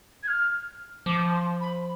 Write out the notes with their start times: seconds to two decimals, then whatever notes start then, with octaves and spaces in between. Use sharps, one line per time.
0.23 G#6
0.28 F6
1.06 F3 D6
1.34 C6
1.61 B5